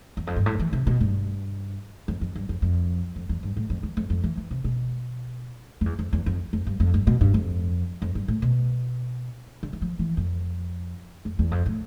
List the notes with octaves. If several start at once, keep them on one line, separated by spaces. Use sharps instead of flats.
E2
F2
G2
A2
E3
C3
B2
G2
F2
F2
G2
F2
F2
F2
E2
G2
A2
F2
E2
F2
F2
E3
E3
C3
B2
F2
E2
F2
E2
F2
F2
G2
F2
G2
B2
G2
F2
F2
G2
A2
B2
D3
E3
F3
E3
F2
F2
E2
F2
A2